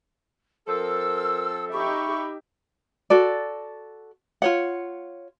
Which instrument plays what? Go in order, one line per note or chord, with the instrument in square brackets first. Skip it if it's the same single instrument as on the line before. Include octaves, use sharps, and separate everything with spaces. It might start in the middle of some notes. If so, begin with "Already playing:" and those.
[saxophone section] F3 C4 A4 [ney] A#4 [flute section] E6
[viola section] D#4 G4 E5 [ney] B5 [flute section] C#6
[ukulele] F#4 A4 D5
F4 C#5 F#5